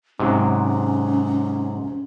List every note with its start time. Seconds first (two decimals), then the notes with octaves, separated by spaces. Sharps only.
0.19 G#2 C3 F#3 C#4